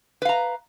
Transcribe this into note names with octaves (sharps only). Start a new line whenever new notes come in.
B4 F5 A#5